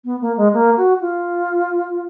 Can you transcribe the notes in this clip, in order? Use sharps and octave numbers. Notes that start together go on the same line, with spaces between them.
B3
A#3
G#3
A#3
F#4
F4